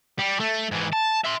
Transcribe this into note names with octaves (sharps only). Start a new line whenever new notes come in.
G3
A3
G#2 E3
A5
E5 C6